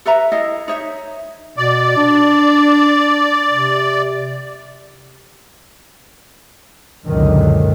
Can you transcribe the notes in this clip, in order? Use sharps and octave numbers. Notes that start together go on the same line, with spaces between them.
A4 B4 E5 A#5
E4 A4 D#5 F5
D#4 C#5 E5
B2 D5
D4
C3
C#2 F#2 A#2 D3 D#3